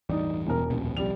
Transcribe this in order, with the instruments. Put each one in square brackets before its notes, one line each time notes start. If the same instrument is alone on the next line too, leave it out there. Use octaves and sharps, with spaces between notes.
[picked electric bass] A1 E2 G2 [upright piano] D#4 D5
[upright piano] E1 A#4
[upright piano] D#1 [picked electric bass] A#1 F2 B2
[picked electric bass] C2 F2 [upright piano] G3 D5 F7